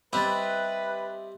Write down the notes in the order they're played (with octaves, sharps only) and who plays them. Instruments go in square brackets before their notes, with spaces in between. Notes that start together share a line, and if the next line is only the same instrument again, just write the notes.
[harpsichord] G3 C4 [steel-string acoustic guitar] G4 D#5 E5 [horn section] B4 [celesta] B5 A6